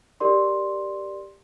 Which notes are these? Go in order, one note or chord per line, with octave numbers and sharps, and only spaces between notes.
G4 A#4 D5 C6